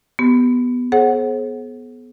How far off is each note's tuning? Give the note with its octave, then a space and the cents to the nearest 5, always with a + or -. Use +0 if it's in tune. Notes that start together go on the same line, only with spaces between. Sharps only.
B3 +0 G4 +0
G#4 +40 C5 +40 F#5 +0